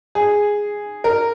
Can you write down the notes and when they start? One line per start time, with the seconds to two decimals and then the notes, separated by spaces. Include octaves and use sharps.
0.15 G#4
1.04 A#4